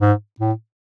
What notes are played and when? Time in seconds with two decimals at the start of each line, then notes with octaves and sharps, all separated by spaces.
0.01 G#2
0.40 A2